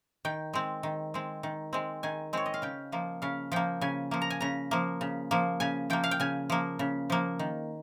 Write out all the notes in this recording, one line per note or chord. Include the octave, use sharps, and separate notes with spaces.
D#3 G5
G#3 C4
D#3
G#3 C4
D#3
G#3 C4
D#3 G#5
G#3 C4 C#5
D#5
F5
C#3 G5
F3 A#3
C#3 F5
F3 A#3 G5
C#3 G#5
F3 A#3
A#5
G#5
C#3 A#5
F3 A#3
C#3
F3 A#3
C#3 G#5
F3 A#3 G5
F5
G5
C#3 G#5
F3 A#3
C#3
F3 A#3
D#3